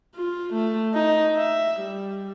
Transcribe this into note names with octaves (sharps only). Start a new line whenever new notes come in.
F4
A3
D#4
E5
G3